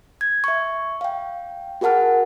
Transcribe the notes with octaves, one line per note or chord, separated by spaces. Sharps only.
G#6
E5 C#6
F5 G5
F#4 G#4 A#4 F#5 A5 F6